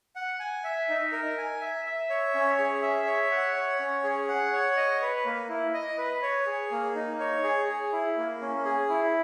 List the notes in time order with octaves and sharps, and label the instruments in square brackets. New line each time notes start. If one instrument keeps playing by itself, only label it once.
[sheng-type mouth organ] F#5
G#5
E5
D#4
A#4
G#5
E5
E5
C#5
C#4
G#4
E5
C#5
F#5
C#5
C#4
G#4
F#5
C#5
D#5
B4
A#3
E4
D#5
B4
C#5
G#4
A#3
D#4
C#5
G#4
G#4
E4
A#3
C#4
G#4
E4